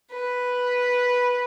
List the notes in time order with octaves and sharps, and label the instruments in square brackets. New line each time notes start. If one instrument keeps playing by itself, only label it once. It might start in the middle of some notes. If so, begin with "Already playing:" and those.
[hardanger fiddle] B4